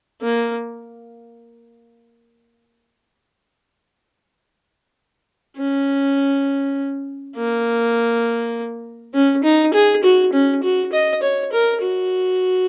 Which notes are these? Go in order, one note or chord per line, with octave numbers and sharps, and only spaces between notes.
A#3
C#4
A#3
C#4
D#4
G#4
F#4
C#4
F#4
D#5
C#5
A#4
F#4